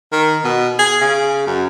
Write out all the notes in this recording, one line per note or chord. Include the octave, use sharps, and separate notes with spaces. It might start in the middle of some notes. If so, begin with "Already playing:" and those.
D#3
B2
G#4
C#3
F#2